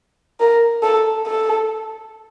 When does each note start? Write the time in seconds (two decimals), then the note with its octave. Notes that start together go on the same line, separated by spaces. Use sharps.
0.40 A#4
0.83 A4
1.26 A4